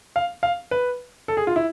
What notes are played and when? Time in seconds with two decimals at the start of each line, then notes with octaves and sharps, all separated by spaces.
0.16 F5
0.43 F5
0.71 B4
1.28 A4
1.37 G#4
1.47 F4
1.56 E4